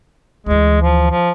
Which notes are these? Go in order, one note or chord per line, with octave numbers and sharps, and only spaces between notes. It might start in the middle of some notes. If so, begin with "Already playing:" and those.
D2 E3 G#3
F3
F3